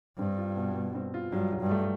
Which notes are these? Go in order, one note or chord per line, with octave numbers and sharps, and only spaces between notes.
G2 C4
F4
B2
B2
C4
F4
G2 F#3
F#3
G2
A3